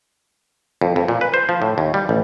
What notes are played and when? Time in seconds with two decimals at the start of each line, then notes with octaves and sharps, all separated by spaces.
0.81 F2
0.96 F2
1.08 A#2
1.21 B4
1.34 C5
1.49 F3
1.62 A2
1.78 D#2
1.94 G3
2.09 A1